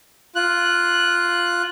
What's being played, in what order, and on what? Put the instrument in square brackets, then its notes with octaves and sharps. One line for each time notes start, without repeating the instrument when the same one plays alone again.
[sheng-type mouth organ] F4 F#6